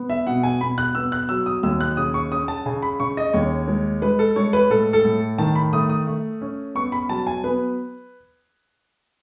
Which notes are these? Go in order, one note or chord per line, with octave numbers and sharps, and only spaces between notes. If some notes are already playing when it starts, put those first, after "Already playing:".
Already playing: B3
E5
B2 F#5
G#5
B2 B5
F#6
B3 E6
F#6
F#3 E6
D#6
D#2 E6
F#6
C#3 D#6
C#6
C#4 D#6
A5
C#3 G#5
B5
C#3 C#6
D#5
D#2 C#5
G#3
G#3 B4
A4
G#3 C#5
B4
A2 A4
A4
A2
D#3 A5
B5
A3 D#6
D#6
A3
C#4
B3 C#6
B5
F#3 A5
G#5
B3 B4